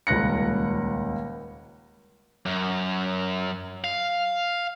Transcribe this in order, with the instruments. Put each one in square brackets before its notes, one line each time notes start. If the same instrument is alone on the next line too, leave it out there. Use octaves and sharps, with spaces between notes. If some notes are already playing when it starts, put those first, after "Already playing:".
[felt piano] D#1 C#2 F#6 A#6 C#7
[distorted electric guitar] F#2
F5